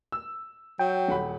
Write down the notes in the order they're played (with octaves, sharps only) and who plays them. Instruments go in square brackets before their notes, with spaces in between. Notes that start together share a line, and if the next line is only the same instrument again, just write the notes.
[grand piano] E6
[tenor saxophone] F#3 [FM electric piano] G5
[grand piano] D#1 F#5 B5